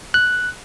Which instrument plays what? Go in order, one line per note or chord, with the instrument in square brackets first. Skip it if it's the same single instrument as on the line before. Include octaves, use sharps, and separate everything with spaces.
[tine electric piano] F#6